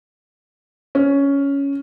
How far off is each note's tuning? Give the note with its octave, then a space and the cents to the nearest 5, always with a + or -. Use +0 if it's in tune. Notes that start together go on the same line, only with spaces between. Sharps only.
C#4 +10